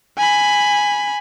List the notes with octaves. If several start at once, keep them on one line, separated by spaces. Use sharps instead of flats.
G#5 B5